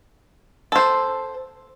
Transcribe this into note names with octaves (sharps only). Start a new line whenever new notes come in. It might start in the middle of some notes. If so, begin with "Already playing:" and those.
A4 C5